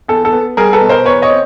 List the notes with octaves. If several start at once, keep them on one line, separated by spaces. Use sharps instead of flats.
E2 A4
A4
B3
G3 G#4 A#4
A4 B4
B2
A#4 C5
E2 B4 C#5
C#5 D#5
C4